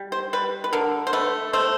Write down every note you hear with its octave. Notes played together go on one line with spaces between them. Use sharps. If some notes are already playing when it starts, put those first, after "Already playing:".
Already playing: G3
C5
G3 B4
B4
D3 A#4
C5
A3 B4
A3 C5